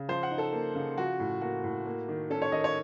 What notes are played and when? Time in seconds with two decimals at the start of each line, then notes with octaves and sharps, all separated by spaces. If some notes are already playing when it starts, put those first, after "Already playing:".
Already playing: C#3
0.09 F3 C5
0.23 F#5
0.31 D#4
0.38 A4
0.53 A#3
0.75 C#3
0.98 F3 F#4
1.20 A2
1.41 A#3 F#4
1.64 A2
1.86 A#3
2.09 D#3
2.30 C#4 A4
2.42 C#5
2.52 D#3 D#5
2.64 C#5